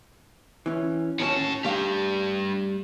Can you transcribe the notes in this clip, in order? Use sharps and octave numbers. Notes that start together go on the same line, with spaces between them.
E3 C#4
D#2 A2 C#4 F#4 A5
G3 A3 D4 G4 F5